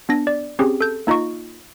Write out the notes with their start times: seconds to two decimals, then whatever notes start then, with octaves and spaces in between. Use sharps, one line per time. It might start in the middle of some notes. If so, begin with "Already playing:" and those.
0.09 B3 D4 A#6
0.27 D5
0.59 C4 C#4 G4 G#4
0.81 A4 G6
1.07 A#3 D#4 F4 D#5 C#6